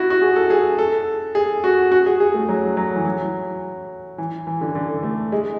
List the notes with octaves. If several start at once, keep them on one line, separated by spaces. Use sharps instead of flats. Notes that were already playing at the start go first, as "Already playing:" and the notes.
Already playing: E4 F#4
F#4
G#4
A4
G#4
A4
G#4
F#4
F#4
G#4
G#4
A3
F#3
F#3
E3
F#3
E3
E3
D3
D3
A3
G#3